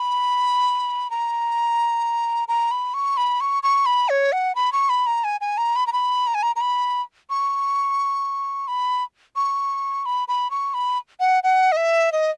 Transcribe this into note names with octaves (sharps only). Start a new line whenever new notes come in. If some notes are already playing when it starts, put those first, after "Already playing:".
Already playing: B5
A#5
A#5
B5
C#6
B5
C#6
C#6
B5
C#5
F#5
B5
C#6
B5
A#5
G#5
G#5
A#5
B5
A#5
B5
A#5
G#5
A#5
A#5
B5
C#6
B5
C#6
B5
B5
C#6
B5
F#5
F#5
D#5
E5
D#5